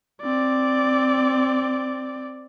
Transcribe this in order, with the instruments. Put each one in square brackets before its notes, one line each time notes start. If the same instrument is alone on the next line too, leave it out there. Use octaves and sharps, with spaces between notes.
[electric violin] C4 D5